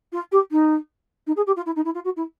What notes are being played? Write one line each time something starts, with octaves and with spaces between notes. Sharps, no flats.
F4
G4
D#4
D#4
G#4
G4
F4
E4
D#4
E4
F4
F#4
E4